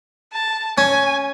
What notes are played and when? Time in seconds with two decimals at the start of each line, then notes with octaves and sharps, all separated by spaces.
0.32 A5
0.78 C#4 G#5